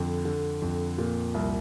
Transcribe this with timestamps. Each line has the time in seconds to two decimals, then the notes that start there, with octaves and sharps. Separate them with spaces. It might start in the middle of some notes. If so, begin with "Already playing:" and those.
Already playing: F2 D3
0.25 D3
0.62 F2
0.98 A#2
1.34 C2